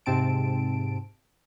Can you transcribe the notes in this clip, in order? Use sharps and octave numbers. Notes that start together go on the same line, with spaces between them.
G#2 C3 C4 A5 D7